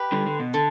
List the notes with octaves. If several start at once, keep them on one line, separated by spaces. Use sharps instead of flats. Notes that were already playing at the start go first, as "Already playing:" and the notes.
Already playing: G4 B4
D3 G3
D3
B2
D3 A4